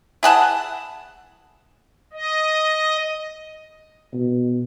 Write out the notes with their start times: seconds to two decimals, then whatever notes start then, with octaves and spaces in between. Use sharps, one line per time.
0.23 E4 G#4 F#5 A5
2.13 D#5
4.14 B2